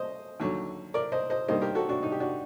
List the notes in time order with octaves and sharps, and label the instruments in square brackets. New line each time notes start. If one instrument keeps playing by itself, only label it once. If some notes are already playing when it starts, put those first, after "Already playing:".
Already playing: [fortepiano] C5 D#5
D#2 D3 F#3
A#4 D5
C5 D#5
C5 D#5
G2 D#3 G3 A#3 C5 D#5
G4 A#4
F#4 A4
D4 F#4
D#4
G4
D4 F#4